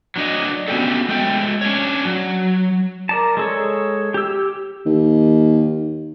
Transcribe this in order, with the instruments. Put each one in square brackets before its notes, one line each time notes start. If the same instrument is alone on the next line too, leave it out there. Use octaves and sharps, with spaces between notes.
[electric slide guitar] F#3 D4 D#5
A3 B3 C#4 F#4 G4 A4
G#3 A3 G5
C#4 D4 C#5
F#3
[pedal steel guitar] A#4 D5 A5
G#3 A4 C#5
G4 E6
[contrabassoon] D#2